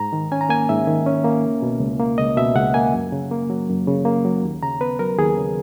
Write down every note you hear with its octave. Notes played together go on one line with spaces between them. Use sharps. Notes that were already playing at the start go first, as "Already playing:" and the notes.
Already playing: G#2 A#5
D#3
C#4 G#5
A#5
A#3 G#5
G#2 E5
D#3
C#4
A#3
C#2
B2
C#2
A#3
C#2 D#5
B2 E5
C#2 F#5
A#3 G#5
F#2
C#3
A#3
F#3
F#2
C#3
A#3
F#3
D#2
C#3 A#5
B3 B4
F#3 A#4
D#2 G#4
C#3